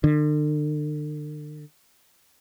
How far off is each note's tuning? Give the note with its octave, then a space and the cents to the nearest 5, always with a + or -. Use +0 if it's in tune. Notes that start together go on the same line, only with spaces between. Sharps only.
D3 +40